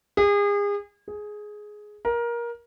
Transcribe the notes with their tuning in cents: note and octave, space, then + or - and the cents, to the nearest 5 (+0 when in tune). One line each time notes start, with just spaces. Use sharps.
G#4 -35
G#4 +10
A#4 +20